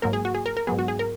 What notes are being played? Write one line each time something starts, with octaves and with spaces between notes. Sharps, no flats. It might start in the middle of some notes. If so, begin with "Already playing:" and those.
G#2 F#3 A#3 A#4
G#4
F#4
G#4
A#4
A#4
G#2 F#3 B3 G#4
F#4
G#4
A#4